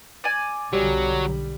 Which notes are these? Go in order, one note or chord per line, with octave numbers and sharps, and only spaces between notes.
D5 G#5
B1 D3 F#3 G3